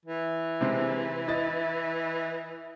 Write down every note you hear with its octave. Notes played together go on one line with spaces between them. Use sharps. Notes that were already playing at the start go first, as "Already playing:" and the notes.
E3
C3 G#3 C4
E4 D#5 A6